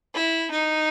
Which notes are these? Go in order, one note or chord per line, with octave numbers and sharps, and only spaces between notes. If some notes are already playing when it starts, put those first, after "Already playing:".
E4
D#4